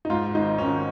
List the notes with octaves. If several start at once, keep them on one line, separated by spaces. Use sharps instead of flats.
D#4
G#2 F4
G#1 D#4
D#3 C#4